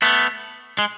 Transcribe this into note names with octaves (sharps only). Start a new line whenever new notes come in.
A3 B3
G#3